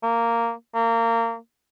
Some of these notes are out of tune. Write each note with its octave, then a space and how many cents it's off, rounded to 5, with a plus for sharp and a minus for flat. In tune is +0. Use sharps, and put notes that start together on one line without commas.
A#3 -10
A#3 -25